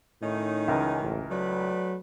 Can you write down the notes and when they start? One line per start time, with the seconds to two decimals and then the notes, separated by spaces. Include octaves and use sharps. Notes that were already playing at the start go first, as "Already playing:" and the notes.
0.21 A2 D#3 C#4 D#4
0.68 C#2 E3 A#4
1.01 A1
1.30 F#3 A3 B4 D5